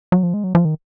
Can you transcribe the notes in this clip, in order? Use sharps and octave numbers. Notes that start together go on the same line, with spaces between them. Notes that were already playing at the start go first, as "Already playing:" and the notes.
F#3
F3
G#3
F#3
F3
D#3